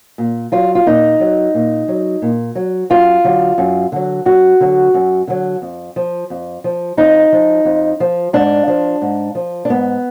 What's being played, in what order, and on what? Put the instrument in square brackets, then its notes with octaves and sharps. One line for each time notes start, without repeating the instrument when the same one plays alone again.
[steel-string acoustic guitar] A#2
F#3 F4
F4
A#2 D#4
F#3
A#2
F#3
A#2
F#3
F#2 F4
D3 F#3
F#2
D3 F#3
F#2 F#4
D3 F#3
F#2
D3 F#3
F2
F3
F2
F3
F2 D#4
F3
F2
F3
G#2 D4
F3
G#2
F3
D4
G#2 B3